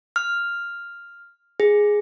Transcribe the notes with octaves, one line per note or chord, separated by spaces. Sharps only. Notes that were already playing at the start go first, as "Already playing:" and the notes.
F6
G#4